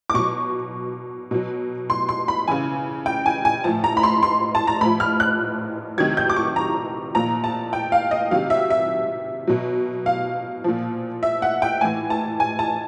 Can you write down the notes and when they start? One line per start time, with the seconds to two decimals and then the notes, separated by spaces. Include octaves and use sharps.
0.10 D6
0.14 B2 F#3 C#6
1.31 B2 F#3
1.90 C6
2.09 C6
2.28 B5
2.48 C#3 E3 G#5
3.06 G5
3.26 G#5
3.45 G#5
3.64 A2 F3 A5
3.84 A#5
3.97 B5
4.03 C6
4.23 C6
4.55 A5
4.67 A#5
4.81 A2 F3 B5
5.00 F6
5.20 F#6
5.98 C3 D#3 F#3 G#6
6.17 G6
6.29 D6
6.36 C#6
6.56 A#5
7.15 A#2 F3 A#5
7.44 A5
7.73 G5
7.92 F5
8.11 D#5
8.31 C3 D#3 F#3 F5
8.50 E5
8.70 E5
9.47 B2 F#3
10.06 F5
10.64 A#2 F3
11.23 E5
11.42 F#5
11.62 G5
11.81 A2 E3 G#5
12.10 A5
12.40 G#5
12.59 A5